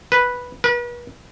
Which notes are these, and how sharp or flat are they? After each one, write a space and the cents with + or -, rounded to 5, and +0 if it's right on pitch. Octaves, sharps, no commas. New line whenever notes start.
B4 -5
B4 -40